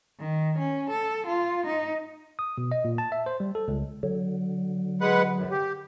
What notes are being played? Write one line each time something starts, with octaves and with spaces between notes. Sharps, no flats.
D#3
C#4
A4
F4
D#4
D#6
B2
D#5
A#2
A5
E5
C5
G3
A4
C#2
D3 F#3
G#3 B4 F#5
F#2
G4